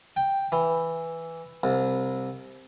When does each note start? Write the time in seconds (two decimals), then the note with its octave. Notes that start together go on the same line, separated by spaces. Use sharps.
0.16 G5
0.52 E3
1.63 C2